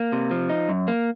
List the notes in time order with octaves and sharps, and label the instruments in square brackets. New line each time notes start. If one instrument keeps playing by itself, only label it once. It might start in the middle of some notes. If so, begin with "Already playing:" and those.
Already playing: [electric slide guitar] A#3
C3
F3
D#4
F#2
A#3